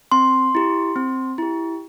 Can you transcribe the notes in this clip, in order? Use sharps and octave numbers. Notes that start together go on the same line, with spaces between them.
C4 C6
E4 G4
C4
E4 G4